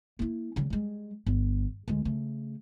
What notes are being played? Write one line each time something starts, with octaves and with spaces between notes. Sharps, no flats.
A#3 E4
C#3 G3
G3 G#3
G1
D2 G#3
C#3 A3